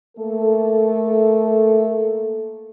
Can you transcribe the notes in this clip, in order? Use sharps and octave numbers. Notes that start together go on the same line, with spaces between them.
A3 A#3 A4